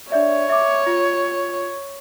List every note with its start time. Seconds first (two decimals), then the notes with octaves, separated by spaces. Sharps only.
0.12 D4 C#5 D5 E5
0.49 E5 D6
0.86 F4